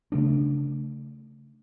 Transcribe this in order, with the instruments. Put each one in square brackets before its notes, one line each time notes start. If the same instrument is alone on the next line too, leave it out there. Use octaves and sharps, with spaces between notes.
[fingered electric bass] C#3 A3 D4